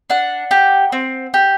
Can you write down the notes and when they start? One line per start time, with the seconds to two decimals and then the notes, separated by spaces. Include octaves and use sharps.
0.10 D4 F#5
0.51 G4
0.92 C4
1.34 G4